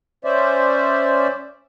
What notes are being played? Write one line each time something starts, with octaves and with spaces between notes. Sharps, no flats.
C#4 C5 D5 E5